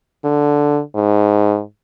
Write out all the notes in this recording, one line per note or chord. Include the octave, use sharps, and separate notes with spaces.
D3
G#2